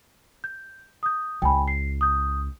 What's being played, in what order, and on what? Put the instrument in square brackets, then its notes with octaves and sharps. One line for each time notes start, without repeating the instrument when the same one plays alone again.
[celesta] G6
D#6 G6
[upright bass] C#2 [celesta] G5 G#5 B5
[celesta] C7
D#6 G6